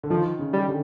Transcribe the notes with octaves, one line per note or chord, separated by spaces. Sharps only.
D3
D#3 F3
C#3
G3
D3